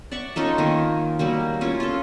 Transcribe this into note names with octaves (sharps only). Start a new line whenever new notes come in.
D5 E5 F#5 C#6
C#4 D#4 F4 A4
D#3 A#3 C#4
F#3 G3 A#3
C#4 E4 F4
F4 A4